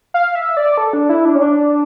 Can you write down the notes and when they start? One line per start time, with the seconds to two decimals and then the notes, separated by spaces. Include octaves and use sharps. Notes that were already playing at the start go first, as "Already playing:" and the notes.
0.14 F5
0.35 E5
0.57 D5
0.78 A4
0.93 D4
1.09 E4
1.25 D4
1.35 C#4
1.41 D4